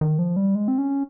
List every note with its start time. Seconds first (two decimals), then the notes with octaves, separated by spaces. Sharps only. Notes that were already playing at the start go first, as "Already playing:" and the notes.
0.01 D#3
0.19 F3
0.36 G3
0.55 G#3
0.68 C4
0.78 C#4